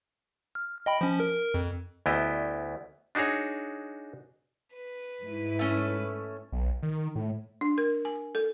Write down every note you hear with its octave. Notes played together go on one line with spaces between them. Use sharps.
F6
D#5 G5 B5
F3 C#4
A#4
F2
D2 B3 E4 G4 D#5
D4 D#4 F#4 G#4 C#5
B4
G#2 E4
A3 C#4
B1
D#3
A2
D4
A#4
G#5
A4